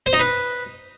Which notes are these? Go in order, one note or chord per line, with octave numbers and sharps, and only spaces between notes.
C5
D#4
B4